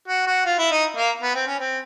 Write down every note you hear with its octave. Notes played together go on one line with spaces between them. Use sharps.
F#4
F#4
F4
E4
D#4
A#3
B3
C4
C#4
C4